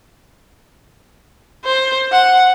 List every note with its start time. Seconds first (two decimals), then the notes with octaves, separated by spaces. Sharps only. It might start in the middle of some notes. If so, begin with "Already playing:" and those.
1.65 C5
2.12 F#5